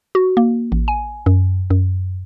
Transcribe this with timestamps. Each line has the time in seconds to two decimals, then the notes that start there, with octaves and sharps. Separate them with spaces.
0.15 F#4
0.37 A#3
0.72 A1
0.88 G#5
1.26 F#2
1.70 F#2